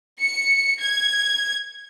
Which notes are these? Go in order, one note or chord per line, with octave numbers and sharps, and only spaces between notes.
C#7
G#6